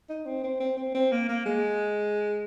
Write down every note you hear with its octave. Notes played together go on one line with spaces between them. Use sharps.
D#4
C4
C4
C4
C4
C4
A#3
A#3
G#3